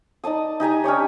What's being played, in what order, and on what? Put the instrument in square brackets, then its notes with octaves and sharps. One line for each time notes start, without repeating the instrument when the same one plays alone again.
[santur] D#4 D5 A5 D#6
D#4 G4 G#5 A#5
C#4 D4 G4 C#5